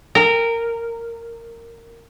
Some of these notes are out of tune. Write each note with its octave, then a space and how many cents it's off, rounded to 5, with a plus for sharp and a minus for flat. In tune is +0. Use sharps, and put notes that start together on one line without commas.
A#4 -15 G5 +40